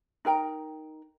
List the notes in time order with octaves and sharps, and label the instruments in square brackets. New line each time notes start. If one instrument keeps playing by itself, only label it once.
[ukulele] D#4 A#4 G5 A#5